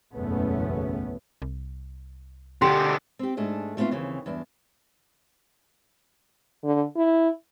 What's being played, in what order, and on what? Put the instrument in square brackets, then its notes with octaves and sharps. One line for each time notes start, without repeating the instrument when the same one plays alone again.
[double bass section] F#1 B1 E2 A3 B3 C#4
[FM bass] C2
[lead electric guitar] B2 D3 [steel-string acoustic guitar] G4 [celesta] C6
[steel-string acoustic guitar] C4 G4
G#2 A3 D4 G#4
G3 A3 B3 C4 F4
D#2 C#3 E3 C4
E2 G2 D4
[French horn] D3
E4